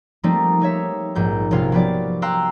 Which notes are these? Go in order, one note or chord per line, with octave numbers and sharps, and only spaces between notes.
F3 G3 A3 A#3 C4 D#4
C4 D#4 C#5 E5
A#1 G#2 G6
A#1 C3 C#4 F4 F5
F3 F#3 B3 G4 D5
F5 G5 A#5 C6 E6 F#6